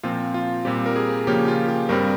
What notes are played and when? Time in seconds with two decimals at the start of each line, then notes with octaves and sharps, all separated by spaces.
0.03 A#2 F3 C4 F4
0.34 F4
0.65 A#2 G3 C4 G4
0.86 A#4
0.96 G#4
1.27 C#3 F3 A#3 C#4 G4
1.48 F4
1.68 G4
1.89 G2 G3 C4 A#4